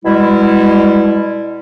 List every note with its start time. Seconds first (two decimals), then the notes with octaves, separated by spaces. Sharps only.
0.05 B2 G3 G#3 E4